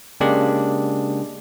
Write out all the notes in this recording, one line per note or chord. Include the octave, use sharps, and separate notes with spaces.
C#3 G#3 A#3 D4 G4 G#4